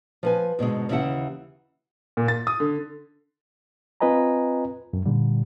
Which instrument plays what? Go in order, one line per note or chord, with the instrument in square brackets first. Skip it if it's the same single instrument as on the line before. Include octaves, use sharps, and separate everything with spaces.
[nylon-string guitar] F3 B4 G#5
G#2 B2 D3 G#3
D#2 C#3 E3 E4 G4 F#5
[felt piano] A#2
A6
D#6
D3
[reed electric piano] C4 F4 B4 D#5 G#5 A#5
F#2
A#2 D3 G3